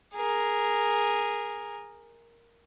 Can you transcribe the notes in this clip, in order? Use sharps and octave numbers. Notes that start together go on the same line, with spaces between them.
G#4 A#4